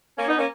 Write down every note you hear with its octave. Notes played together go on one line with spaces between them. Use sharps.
A#3 C#4
B3 D#4
A#3 C#4